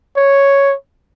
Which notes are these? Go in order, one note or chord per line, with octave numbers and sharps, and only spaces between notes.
C#5